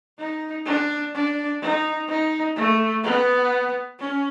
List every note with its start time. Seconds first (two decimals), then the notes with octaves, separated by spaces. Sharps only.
0.19 D#4
0.66 D4
1.14 D4
1.62 D#4
2.08 D#4
2.57 A3
3.04 B3
3.99 C#4